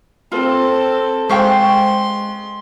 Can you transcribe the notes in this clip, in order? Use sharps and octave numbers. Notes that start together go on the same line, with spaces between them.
C4 F4 A4
G#3 C5 F5 G5 C6 C#6